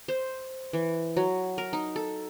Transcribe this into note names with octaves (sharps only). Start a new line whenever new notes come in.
C5
E3
F#3
A#4
D#4
A4